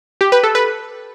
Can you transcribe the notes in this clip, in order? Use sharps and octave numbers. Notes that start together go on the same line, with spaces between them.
G4
B4
A4
B4